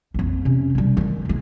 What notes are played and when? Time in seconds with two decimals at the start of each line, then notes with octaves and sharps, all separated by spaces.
0.14 A#1 F2
0.45 C3 C#4
0.75 E1 G3
0.97 D#3 G#3
1.25 D#3 G#3